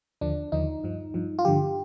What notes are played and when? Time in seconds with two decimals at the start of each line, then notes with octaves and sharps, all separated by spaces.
0.21 D#2 D3 F3 D4
0.52 D#2 D3 F3 D#4
0.84 G2 F3
1.14 G2 F3
1.39 F4
1.45 G2 D3 F3 G4